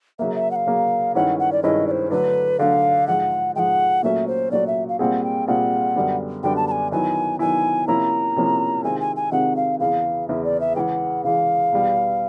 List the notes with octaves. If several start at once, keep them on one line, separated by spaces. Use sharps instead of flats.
C#3 F#3 A#3 E5
E5
F#5
F5
C#3 F#3 A#3
G2 D#3 G#3 C#4 E4 F#5
F#5
D5
G2 D#3 G#3 C#4 E4 D#5
D5
C5
D3 F#3 A3 D4 B4
D3 F#3 A3 D4 F5
G#2 F3 G#3 F#5
G#2 F3 G#3 F#5 G5
A#2 F#3 A3 C#4 F#4 E5
C5
A#2 F#3 A3 C#4 F#4 D5
E5
F5
A#2 G3 C4 F4 G#4 F#5
G5
A#2 G3 C4 F4 G#4 F#5
F#2 D3 G3 B3 D4
F#2 D3 G3 B3 D4 G5
A5
A5
G#5
D#3 F#3 B3 E4 G#5
D#3 F#3 B3 E4 G#5
C3 F3 A#3 C#4 E4 A#5
C3 F3 A#3 C#4 E4
C3 D#3 G#3 C4 F4 G#5
G#5
G#5
C3 D#3 G#3 C4 F4 F#5
F5
E2 C#3 E3 F5
E2 C#3 E3 E5
D5
E5
C#3 E3 G#3 F#5 G5
C#3 E3 G#3 F5
E2 B2 G3